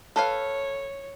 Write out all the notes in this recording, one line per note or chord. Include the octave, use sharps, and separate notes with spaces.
A4 B4 C#5 F5